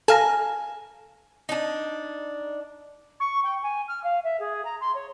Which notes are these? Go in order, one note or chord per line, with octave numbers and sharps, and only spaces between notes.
A4 F5 G#5 A#5
D4 D#4
C#6
G5
G#5
F6
F5
E5
G#4
A#5
C6
C#5